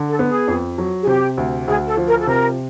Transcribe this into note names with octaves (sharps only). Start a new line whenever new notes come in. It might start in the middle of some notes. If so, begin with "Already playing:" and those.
Already playing: D3
A4
B3
G#4
F2
F#3
G#4
C3 G4
D2
D2 G#4
A4
F3
A#4
A4
C3 A#4